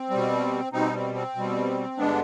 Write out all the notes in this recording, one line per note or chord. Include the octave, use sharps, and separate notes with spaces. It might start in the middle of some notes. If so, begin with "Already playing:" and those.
Already playing: C4
B2 G3
B2 G3 C4 D#4
C4
C4
B2 G3
G2 D3 G#3 B3 D4